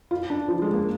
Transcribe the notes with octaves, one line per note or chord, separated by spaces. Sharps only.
F4
D4
F3
G#3
A#3